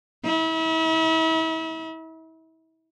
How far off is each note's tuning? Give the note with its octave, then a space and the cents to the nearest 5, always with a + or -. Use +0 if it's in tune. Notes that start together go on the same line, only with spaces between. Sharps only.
E4 -35